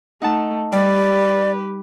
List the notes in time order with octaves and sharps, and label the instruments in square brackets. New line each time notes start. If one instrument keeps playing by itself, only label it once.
[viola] A3 [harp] D#4 F#5 A5
[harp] G3 [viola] G4 B4 [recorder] D5